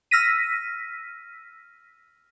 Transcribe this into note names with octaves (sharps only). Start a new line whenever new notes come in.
E6 F6 A#6 B6 D#7